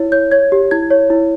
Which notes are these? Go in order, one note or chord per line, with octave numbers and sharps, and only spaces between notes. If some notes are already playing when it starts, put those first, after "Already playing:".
Already playing: E4 C#5
C#5 G6
C#5 G#6
G4
E4 G#6
C#5
E4